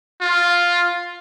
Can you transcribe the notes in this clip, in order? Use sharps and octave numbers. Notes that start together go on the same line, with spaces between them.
F4